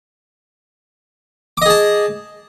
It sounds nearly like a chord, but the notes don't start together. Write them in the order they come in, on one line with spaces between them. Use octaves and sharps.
D6 D#5 G#4 A5